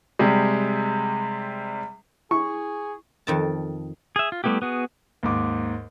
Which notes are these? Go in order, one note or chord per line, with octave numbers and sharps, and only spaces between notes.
C3 G3 G#3
E4 G#4 C#6
F2 D#3 A5
G#4 E5
F4
G3 A3 B3 E4 G4
B3 F#4 G#4
D#2 G#2 D6